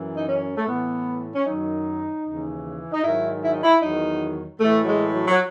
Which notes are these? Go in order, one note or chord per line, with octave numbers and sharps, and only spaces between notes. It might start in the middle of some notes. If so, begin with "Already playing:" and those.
Already playing: F#2 E3
D#4
C#4
A3
A2 E3 B3
C#4
F#2 D#3 F#3 D#4
D#2 C#3 E3
D#4
G#2 D#3 F#3 E4
E4
D#4
E4
E2 D#3 F#3 D#4
A2 E3 A3
F#3
G#3
F#3
F#3